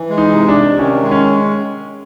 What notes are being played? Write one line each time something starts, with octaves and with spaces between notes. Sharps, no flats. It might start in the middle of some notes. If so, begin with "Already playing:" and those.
Already playing: E3
G#3
D#4
C3
D4
C3
D#3 C#4
G#3
C#4